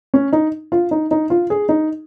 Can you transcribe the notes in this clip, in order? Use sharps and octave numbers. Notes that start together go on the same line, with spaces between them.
C#4
D#4
F4
D#4
D#4
F4
G#4
D#4